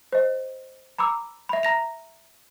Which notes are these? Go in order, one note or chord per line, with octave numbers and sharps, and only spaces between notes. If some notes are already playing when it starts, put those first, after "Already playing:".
C5 D#5
A#5 B5 D6 E6
E5 B5
A#5 A#6 F7